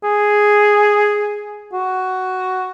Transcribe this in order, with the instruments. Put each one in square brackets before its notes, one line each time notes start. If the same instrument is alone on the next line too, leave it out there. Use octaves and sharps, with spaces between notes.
[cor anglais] G#4
F#4